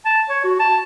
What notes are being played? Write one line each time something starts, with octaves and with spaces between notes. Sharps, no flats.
A5
C#5
F#4
A5